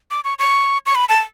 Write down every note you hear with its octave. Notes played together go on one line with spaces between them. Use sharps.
D6
C#6
C#6
C#6
B5
A5